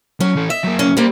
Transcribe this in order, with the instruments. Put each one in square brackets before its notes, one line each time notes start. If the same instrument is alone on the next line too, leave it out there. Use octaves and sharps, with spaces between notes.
[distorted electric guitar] F#3 [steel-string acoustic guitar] C#4
[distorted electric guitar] E3 A4
[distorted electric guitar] D#5 [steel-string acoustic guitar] E5
[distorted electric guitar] F#2 A#3
[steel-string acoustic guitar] C#4
[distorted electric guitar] G3 [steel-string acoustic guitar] A#3 C4